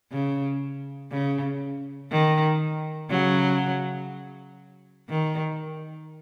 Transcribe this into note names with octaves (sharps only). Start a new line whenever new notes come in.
C#3
C#3
D#3
C#3 F#3
D#3